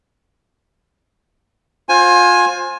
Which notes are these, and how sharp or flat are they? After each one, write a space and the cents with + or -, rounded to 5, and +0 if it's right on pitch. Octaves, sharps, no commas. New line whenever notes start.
F4 +30 C5 +20 G#5 +0